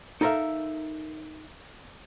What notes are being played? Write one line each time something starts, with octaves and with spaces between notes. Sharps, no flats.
D#4 A4 A#4 C5 E5 F5